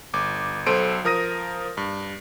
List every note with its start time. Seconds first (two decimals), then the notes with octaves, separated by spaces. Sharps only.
0.14 G1 D6
0.66 B1 A4 C5 D7 D#7
1.05 F3 A#4 D#6 A#6 D#7
1.77 G2